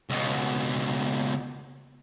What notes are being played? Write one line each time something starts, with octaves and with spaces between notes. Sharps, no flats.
C#2 B2